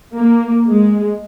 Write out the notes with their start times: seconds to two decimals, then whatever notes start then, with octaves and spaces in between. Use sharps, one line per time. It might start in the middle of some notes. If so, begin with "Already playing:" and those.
0.16 A#3
0.68 G#3